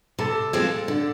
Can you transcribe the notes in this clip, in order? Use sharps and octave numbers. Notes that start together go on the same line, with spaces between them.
C3 A4
F3 G#3 C4 F4
D3